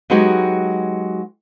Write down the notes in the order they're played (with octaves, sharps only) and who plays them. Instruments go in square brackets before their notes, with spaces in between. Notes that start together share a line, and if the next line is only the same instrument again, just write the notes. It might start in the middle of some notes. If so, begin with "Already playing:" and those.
[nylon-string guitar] F#3 G#3 B3 D#4 F#4 G4